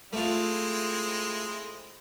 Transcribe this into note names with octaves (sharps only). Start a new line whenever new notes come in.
G#3 A3 C4 E4 F4